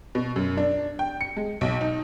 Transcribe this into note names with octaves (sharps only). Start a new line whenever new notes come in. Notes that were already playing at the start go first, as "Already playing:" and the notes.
B2
F#2
D4
G5
C#7
G#3
B1
D#4